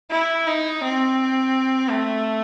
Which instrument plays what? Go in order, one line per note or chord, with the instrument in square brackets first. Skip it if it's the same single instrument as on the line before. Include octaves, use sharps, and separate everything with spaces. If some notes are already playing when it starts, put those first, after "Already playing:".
[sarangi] E4
D#4
C4
A3